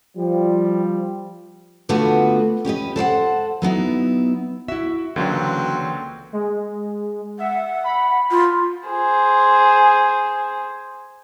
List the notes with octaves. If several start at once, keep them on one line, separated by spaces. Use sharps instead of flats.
F3 G3
D3 A3 B3 F4 F#4 B4
C#4 G4 B4 D#5
A4 C5 C#5 F#5
F#3 B3 D#4 E4
E4 F#4 E5
C#2 D3 E3 F#3 A#3 C4 C#4 F#4
G#3
E5 F#5
B5
F4
G#4 C5